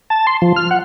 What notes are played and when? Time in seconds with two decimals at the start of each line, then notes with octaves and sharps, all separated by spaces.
0.10 A5
0.27 C6
0.42 F3
0.56 F6
0.71 F#5